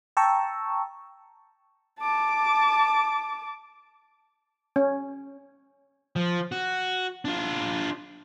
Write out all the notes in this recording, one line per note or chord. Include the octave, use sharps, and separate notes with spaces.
G5 A5 A#5 C#6 E6
A5 D6
C#4
F3
F#4
D4 F4